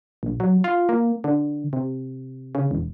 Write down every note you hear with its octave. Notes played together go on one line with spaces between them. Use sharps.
A#1
F#3
F4
A#3
D3
C3
C#3
E1